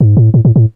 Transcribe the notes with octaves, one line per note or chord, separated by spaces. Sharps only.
G#2
A2
A2
A2
A2